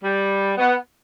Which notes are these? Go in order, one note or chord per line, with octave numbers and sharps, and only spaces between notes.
G3
B3